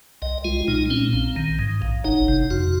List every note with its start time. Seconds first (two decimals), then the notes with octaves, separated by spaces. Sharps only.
0.22 C2 D#5
0.45 G#3 F4
0.67 A#2 D#4
0.90 C4 C#4
1.13 A#1
1.36 D#3
1.59 G#2
1.82 A#1
2.04 F#1 D#4
2.28 C3
2.50 F2 F#4